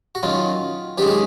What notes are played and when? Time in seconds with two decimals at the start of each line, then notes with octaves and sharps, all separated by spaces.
0.15 F#4
0.23 F#2 D#3 F#3 F4
0.98 F#2 D#3 G#3 G4
1.08 G#4